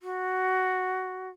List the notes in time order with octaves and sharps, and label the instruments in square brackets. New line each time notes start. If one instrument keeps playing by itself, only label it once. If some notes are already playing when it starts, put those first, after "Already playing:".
[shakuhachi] F#4